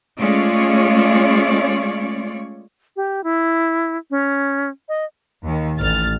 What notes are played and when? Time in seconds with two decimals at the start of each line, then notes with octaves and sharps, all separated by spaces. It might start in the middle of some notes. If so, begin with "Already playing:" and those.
0.19 G#3 A3 C#4 F4 C#5 D5
2.96 G4
3.24 E4
4.11 C#4
4.89 D#5
5.44 D#2 D#3
5.80 A1 F6 A6